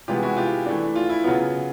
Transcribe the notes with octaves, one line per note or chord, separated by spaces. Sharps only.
C3 E3 G#3 B3 F4 G4
E4 F#4
F4 G4
E3 A3 D4
F4
E4
C#3 F#3 B3 F4